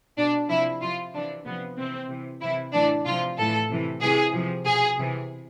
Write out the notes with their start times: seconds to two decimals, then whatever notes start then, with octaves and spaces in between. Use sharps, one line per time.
0.17 B2 D4
0.49 C3 F3 E4
0.81 C3 F3 F4
1.13 C3 E3 D4
1.45 C3 F3 B3
1.78 C3 E3 C4
2.09 C3 E3
2.41 C3 E3 E4
2.73 A2 E3 D4
3.06 C3 F3 F4
3.38 A2 E3 A4
3.70 C3 E3
4.01 C3 E3 G#4
4.33 C3 F3
4.66 B2 G#4
4.97 C3 E3